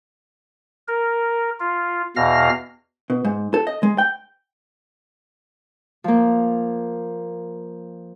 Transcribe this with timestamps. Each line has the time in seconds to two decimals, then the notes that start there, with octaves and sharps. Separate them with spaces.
0.88 A#4
1.60 F4
2.16 E2 B2 F5 F6 A#6
3.10 B2
3.25 G#2
3.54 A4
3.67 D#5
3.83 G#3
3.98 G5
6.04 F3 A#3